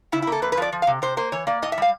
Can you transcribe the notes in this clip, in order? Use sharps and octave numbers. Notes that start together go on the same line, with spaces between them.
C#3 E4
E4
A#3 A4
F2 B4
B4
F3 D5
F3
F5
C3
C3 C5
A#3 C5
E3 C#5
A#3 D5
A2 D#5
E5
G3 F5